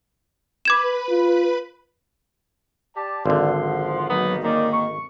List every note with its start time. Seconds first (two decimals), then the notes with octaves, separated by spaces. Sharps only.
0.65 B4 B5 D6 G#6 E7
1.10 F4
2.96 G4 D5 A5
3.26 G#1 D3 F3 D5 F#5 C6
3.64 C5
4.09 F#3 A#3 B3 D#4
4.43 D#3 A#3 C#4 D#4 D5
4.72 C#6